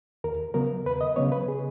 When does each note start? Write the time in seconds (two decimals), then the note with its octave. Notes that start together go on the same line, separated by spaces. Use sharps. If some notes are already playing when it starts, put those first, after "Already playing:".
0.24 D#2 A#4
0.54 C#3 F#3 B3 A#4
0.86 D#2 B4
1.01 D#5
1.16 C#3 F#3 B3 C#5
1.32 B4
1.48 G#4